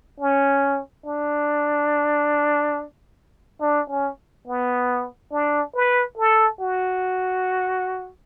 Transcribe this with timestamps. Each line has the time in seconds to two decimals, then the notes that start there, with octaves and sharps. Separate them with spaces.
0.20 C#4
1.05 D4
3.61 D4
3.90 C#4
4.47 B3
5.32 D4
5.75 B4
6.18 A4
6.61 F#4